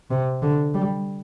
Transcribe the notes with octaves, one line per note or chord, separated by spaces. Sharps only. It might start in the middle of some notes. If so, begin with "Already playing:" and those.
C3
D3
G3